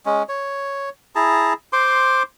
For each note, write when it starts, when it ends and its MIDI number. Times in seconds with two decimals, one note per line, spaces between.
0.06 0.23 56
0.06 0.23 61
0.29 0.89 73
1.15 1.53 64
1.15 1.53 68
1.15 1.53 81
1.15 1.53 82
1.73 2.23 72
1.73 2.23 84
1.73 2.23 86